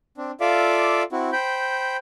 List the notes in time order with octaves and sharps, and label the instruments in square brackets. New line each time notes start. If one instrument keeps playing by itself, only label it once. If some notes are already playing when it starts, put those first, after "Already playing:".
[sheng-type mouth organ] C4 D4
F4 A4 D5 E5 F5 D6
C4 E4 F#4
C5 G5 B5 G6